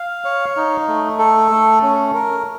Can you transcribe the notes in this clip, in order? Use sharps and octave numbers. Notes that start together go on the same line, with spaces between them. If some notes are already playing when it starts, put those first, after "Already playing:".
Already playing: F5
C#5
D#4
A3
A4
A3
C#4
A#4